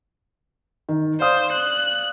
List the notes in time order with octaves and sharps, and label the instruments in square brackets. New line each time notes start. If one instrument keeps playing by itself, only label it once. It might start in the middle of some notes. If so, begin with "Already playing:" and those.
[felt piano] D#3
[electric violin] C5 [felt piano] D5 F5 D#6
[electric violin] F#6